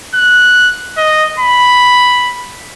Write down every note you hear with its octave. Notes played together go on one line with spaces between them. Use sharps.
F#6
D#5
B5